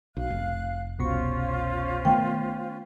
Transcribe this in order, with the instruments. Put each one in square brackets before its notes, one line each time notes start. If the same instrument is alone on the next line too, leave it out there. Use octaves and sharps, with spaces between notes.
[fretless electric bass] B1 [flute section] F5 F#6
[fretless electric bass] F1
[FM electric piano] C2 B2 C#6 [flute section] C#4 F4 C5
[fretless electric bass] D#3 A3 B3 [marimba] G5